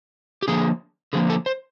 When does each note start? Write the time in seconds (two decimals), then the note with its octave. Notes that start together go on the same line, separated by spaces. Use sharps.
0.42 G4
0.48 D3 F3 A#3 G#4
1.13 D3 F3 A#3 G#4
1.30 A4
1.46 C5